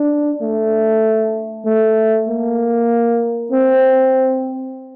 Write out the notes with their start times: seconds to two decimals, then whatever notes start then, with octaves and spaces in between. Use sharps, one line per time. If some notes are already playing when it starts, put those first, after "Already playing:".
Already playing: D4
0.42 A3
1.65 A3
2.29 A#3
3.52 C4